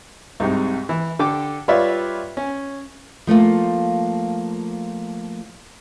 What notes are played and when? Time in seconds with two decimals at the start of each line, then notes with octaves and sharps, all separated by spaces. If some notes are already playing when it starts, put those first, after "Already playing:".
0.40 C2 G#2 C3
0.89 E3
1.19 D3 G4 A4 D6
1.68 G3 F4 B4 C#5 D5 E5
2.37 C#4
3.27 F3 A3 A#3 F4